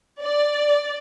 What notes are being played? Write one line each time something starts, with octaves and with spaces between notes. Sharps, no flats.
D5